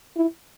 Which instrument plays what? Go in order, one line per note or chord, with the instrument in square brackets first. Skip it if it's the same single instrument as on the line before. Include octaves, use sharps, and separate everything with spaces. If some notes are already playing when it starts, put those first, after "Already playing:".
[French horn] E4